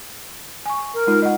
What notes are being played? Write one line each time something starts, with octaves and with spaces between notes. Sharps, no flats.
G#5 C#6
A#4
G#3 D#4 F4
D#5 F#5